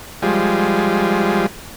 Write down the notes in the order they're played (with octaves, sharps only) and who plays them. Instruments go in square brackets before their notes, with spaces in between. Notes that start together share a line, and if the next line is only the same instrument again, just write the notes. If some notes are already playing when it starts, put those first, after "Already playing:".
[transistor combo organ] F3 G3 G#3